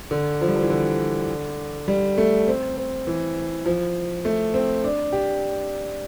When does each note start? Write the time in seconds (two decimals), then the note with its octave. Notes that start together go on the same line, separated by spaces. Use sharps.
0.11 D3
0.41 F3
0.48 G3
0.56 F3
0.62 E3
0.70 D3
1.88 G3
2.18 A3
2.48 C4
2.77 C4
3.07 E3
3.66 F3
4.25 A3
4.54 C4
4.84 D4
5.13 G4